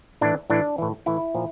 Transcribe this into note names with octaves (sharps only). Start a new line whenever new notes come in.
A2 E3 D4
A2 E3 D4
A2 E3
A2 E3 E4
A#2 F3